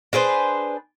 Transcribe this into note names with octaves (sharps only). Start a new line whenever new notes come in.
D4 G#4 B4 C5